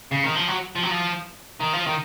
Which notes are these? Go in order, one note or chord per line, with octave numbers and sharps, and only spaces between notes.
C#3
D#3
F3
F#3
F3
F#3
F3
D#3
F3
D#3